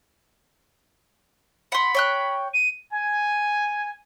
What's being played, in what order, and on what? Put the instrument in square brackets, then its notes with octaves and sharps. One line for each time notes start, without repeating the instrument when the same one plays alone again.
[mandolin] F#5 C6 [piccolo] B5
[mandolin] C#5 G5 F#6
[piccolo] D#7
[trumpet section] G#5